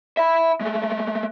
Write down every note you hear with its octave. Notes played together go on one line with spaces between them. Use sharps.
E5 B5
G#3 A3